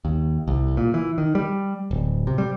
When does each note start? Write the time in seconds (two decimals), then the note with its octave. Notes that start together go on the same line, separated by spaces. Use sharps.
0.05 D#2
0.48 C2
0.77 A#2
0.94 E3
1.18 D#3
1.35 G3
1.91 D1
2.27 C3
2.38 G3